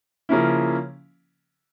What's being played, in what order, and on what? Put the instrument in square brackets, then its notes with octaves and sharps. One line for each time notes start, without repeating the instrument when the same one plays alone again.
[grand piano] C#3 F3 A#3 C#4 E4